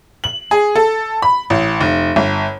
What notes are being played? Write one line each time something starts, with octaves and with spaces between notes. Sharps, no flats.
F#7
G#4
A4
B5
A1
F1
G1